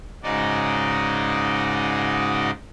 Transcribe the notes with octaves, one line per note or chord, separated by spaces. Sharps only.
G#2 C#3 D#4 F#4 D5 D#5